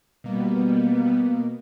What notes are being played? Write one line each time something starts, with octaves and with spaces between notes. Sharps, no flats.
B2 G3 A#3 B3